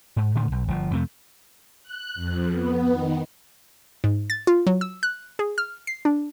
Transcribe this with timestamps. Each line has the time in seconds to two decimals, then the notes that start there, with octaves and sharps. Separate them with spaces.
0.16 G#2
0.35 A2 D3 D#3 A3
0.52 B1
0.68 G1 F3
0.91 F2 C3 A3
1.83 F#6
2.15 F2
2.51 B3
2.91 D#3
4.04 G#2
4.30 A6
4.47 F4
4.67 F#3
4.81 E6
5.03 F#6
5.39 G#4
5.58 F6
5.87 C7
6.05 D4